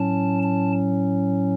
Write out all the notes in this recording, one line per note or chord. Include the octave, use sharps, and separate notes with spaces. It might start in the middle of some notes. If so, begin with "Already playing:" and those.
Already playing: A2 F#3 C#4 A5
A5